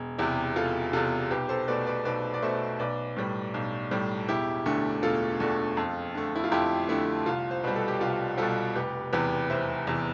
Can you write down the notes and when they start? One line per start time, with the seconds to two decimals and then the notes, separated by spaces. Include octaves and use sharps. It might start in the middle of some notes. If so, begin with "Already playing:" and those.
Already playing: E1
0.18 E2 C3 E4 G4
0.56 E1 F4 A4
0.93 E2 C3 F4 A4
1.31 B1 G4 B4
1.49 A4 C5
1.68 B2 A3 B4 D5
1.86 B4 D5
2.05 B1 B4 D5
2.34 D5
2.42 B2 A3 C5 E5
2.79 B1 B4 D5
3.17 A2 G3
3.54 B1
3.91 A2 G3
4.28 E1 E4 G4
4.66 D2 D3 A3
5.03 E1 F4 A4
5.40 D2 D3 A3
5.77 F2
6.15 D3 A3
6.36 E4
6.44 F4
6.52 F2 E4 G4
6.89 D3 A3 E4
7.26 C2 F4
7.51 C5
7.64 B2 G3 B4
7.76 A4
7.88 G4
8.00 C2 F4
8.38 B2 G3 F4 A4
8.75 F1 G4 B4
9.13 E2 C3 E3 G4 B4
9.50 F1 C5 E5
9.87 E2 C3 E3